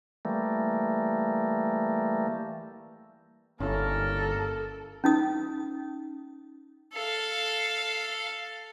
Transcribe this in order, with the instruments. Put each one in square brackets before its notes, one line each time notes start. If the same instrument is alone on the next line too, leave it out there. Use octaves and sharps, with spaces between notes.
[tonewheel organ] E3 G3 A3 A#3
[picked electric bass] G1 [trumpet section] A#3 A#4 [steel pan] C#4 E4 [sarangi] A4
[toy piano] C#4 D#4 D#6
[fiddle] A4 F5